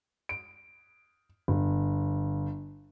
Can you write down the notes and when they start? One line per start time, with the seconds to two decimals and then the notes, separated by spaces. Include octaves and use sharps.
0.29 D7
1.48 G1